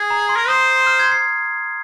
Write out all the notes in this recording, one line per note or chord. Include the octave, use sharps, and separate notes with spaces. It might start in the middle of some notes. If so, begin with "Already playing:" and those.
Already playing: G#4
A#5
C6
A#4
C5 D#6
F6
G#6
C7